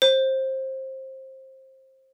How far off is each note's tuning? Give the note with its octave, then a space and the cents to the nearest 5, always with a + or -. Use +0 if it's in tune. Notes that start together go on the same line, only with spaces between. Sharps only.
C5 +20